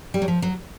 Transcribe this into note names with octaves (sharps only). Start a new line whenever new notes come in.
G3
F#3
F3
F#3